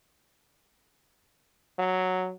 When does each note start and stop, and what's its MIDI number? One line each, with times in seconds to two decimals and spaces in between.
1.79 2.32 54